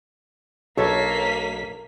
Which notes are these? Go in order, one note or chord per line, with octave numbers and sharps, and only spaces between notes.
B1 A#3 D4 A4 C#5 E5 A5 B6